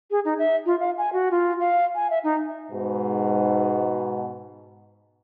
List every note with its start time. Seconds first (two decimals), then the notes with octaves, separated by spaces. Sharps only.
0.11 G#4
0.25 D#4
0.39 E5
0.66 F4
0.80 F5
0.98 G#5
1.13 F#4
1.31 F4
1.60 F5
1.95 G#5
2.10 E5
2.24 D#4
2.70 G#2 B2